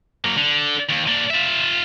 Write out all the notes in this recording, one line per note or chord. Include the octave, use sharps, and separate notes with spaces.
F#3 A#3
D3
D#2
A#3 D4
F4 E5